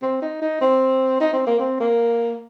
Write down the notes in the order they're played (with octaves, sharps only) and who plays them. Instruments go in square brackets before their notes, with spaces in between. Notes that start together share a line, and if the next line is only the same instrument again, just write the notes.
[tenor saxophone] C4
D#4
D#4
C4
D#4
C4
A#3
C4
A#3